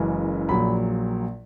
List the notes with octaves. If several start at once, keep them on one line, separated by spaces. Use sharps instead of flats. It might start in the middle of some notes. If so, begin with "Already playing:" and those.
Already playing: F#1 F#2 C#3 E3 G#3
A#1 A#2 F#3 B5